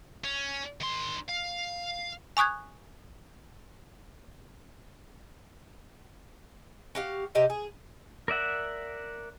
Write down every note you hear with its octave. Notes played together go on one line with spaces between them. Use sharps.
C#4
D#3 C6
F5
G#5 C#6 D#6 F#6 G#6
F#4 G4 F5
C3 G4 D#5 E5
G#4
A#4 D5 E5 F#5